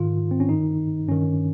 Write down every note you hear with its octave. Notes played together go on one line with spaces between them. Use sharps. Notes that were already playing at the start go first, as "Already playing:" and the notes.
Already playing: G#2 D#3 F4
C4
C#4
G2 D#3 D#4
G2 D#3 C#4